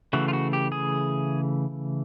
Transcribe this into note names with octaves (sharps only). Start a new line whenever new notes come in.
C#3 E3 A3 F#4
F4
F#4
G4
G#4